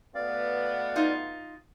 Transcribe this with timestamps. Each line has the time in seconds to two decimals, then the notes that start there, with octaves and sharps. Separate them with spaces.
0.15 B2 A3 B3 D5 F5
0.96 D#4 F4